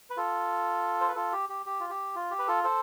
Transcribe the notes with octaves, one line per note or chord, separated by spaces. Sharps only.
B4
F4 A4
C5
B4
F4 A4
G4
G4
G4
F4
G4
F4
G4
B4
F4 A4
A4 C5